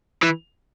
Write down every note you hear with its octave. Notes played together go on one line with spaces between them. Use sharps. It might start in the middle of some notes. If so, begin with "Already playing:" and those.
E3